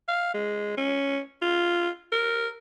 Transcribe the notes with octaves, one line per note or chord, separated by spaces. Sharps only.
F5
G#3
C#4
F4
A#4